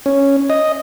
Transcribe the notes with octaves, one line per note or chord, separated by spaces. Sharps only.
C#4
D#5